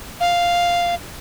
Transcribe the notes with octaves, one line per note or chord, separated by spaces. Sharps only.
F5